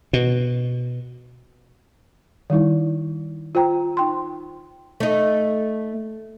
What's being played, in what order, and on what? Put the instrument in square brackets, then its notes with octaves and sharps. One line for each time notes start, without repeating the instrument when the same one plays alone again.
[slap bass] B2
[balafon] D#3 G3 D#4 E4
F4 C5 G5 A#5
D#4 G5 C6
[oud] A3 D#4